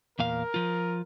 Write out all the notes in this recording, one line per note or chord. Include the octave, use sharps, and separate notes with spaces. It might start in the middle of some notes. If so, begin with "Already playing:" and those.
E2 A#2 A#4 F5
F3 F4